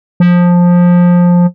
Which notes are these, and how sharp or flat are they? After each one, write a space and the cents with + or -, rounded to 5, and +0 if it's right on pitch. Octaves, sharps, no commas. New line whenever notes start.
F3 +15